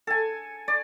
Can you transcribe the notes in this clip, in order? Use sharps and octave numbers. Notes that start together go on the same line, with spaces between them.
A4 G#5
D5